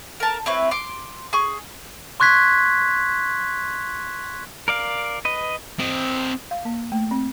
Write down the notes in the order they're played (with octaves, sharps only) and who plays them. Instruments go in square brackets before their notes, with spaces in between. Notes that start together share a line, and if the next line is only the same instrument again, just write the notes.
[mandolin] A#4 A5
C4 E4 B4 C#5
C6 D6
G#4 C#6
[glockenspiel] C6 C#6 F#6 G#6 B6
[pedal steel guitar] A#4 D5 F5
B4 D#5
[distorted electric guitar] C4 D#5
[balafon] F5
A#3
A3
C4